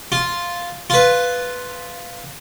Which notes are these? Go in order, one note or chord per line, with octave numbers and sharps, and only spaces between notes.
F4
F4 B4